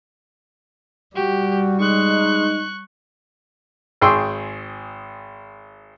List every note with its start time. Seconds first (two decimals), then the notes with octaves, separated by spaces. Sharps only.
1.16 G3 F#4 G4
1.80 G#3 D#4 C#6 F#6
4.01 G#1 G#4 G5 C6 C#6 E6